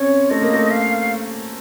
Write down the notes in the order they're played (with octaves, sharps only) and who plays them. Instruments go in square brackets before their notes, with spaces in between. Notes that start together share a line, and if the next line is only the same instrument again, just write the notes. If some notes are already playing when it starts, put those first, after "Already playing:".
Already playing: [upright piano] C4 C#4 [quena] C#5
[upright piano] A3 [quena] D#5
[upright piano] A#3
A3
[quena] F5